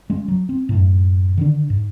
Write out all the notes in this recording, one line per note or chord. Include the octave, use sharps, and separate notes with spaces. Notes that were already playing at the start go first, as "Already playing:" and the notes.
G#3 C#4
F#3
C4
F#2 A2
D3 D#3 D4
G#2